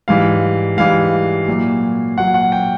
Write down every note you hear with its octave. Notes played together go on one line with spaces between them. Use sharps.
G#2 E3 G3 F5
G#2 E3 G3 F5
A#2 F#3
A#2 F#3 F#5
F#5
G5